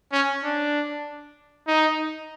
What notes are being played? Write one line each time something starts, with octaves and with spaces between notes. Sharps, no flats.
C#4
D4
D#4